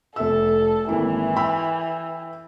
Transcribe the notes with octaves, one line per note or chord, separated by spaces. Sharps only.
F1 A4 E5 E6
G#1 E3 A#3 E4
G5 B5 E6